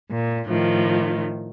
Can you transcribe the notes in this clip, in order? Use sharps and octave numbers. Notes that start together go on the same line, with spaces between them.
A#2
A2 D#3 F3